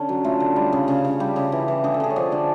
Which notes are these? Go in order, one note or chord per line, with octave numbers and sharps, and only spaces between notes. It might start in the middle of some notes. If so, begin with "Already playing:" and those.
Already playing: D3 C#4
F#3
A3 F4
D3
G3
C#3
C#3
C#3
G3 G4
C#3
E3
E3
D3 G#4
A4
D3 G#4
C#5
F3 D5
D3 D5